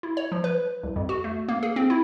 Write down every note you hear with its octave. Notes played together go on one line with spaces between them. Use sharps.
E4
C#5
F3
B4
C2
F2
F#4
A3
A#3
G#4
C4
E4